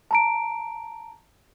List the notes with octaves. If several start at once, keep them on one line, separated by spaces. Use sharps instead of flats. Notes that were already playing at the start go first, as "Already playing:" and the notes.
A5 A#5 D7